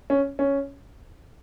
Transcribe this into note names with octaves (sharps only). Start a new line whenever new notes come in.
C#4
C#4